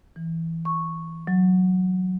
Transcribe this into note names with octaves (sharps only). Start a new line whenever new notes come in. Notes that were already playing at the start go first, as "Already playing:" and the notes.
E3
C#6
F#3